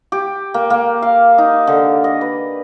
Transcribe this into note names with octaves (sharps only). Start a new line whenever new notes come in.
G4
A#3
A#3
F5
D#4
D3
D#5
B4